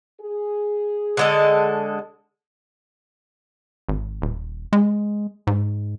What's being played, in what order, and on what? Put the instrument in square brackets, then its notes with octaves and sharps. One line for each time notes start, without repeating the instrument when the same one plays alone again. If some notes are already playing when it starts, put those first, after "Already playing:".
[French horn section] G#4
[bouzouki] D3 G#3 A4
[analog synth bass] G#1
D#1
G#3
G#2